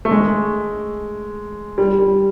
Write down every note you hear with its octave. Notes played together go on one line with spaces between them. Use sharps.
A3
G#3
G3
G3